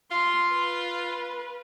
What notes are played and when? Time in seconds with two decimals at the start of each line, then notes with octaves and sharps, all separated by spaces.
0.11 F4 C6
0.54 B4